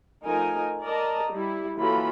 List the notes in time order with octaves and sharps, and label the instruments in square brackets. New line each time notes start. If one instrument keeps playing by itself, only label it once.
[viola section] F3 A3 D#4 A#4 G#5
A#4 D5 D#5 A5 A#5
G3 E4
E3 F#3 A#3 F4 A4 B5